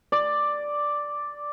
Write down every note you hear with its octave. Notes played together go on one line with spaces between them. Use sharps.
D5